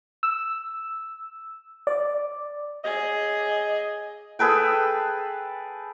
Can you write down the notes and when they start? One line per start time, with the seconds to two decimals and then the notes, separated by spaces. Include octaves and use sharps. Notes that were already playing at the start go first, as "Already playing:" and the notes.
0.23 E6
1.87 D5
2.84 G#4 D#5
4.39 G#4 A4 B4 G5